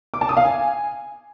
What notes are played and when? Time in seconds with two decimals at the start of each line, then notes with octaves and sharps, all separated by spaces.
0.14 D6
0.21 A5
0.29 D#6
0.37 F5
0.44 G#5